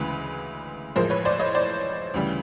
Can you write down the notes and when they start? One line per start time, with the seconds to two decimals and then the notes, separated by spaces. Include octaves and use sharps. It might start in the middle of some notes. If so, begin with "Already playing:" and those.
Already playing: D2 C#3 E3 G#3 B4
0.96 A1 A2 F3 G#3 A#4 C5
1.10 B4 C#5
1.25 C5 D5
1.39 C#5 D#5
1.55 C5 D5
2.14 D2 C#3 E3 G3